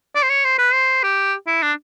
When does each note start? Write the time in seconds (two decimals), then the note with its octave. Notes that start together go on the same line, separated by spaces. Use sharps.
0.15 D5
0.23 C5
0.30 C#5
0.45 C5
0.59 B4
0.74 C5
1.03 G4
1.47 E4
1.63 D4